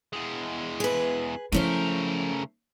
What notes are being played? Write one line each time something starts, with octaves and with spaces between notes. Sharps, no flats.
E2 G#3
G#4 B4
C#3 F3 A3 C#4 E4 A#4 C5